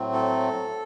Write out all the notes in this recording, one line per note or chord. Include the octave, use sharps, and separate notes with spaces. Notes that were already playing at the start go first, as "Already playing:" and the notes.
Already playing: A2 F#3 A3 C4
A4